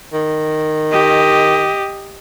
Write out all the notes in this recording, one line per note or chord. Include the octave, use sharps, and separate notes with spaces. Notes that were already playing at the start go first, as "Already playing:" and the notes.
D#3
G4 D#5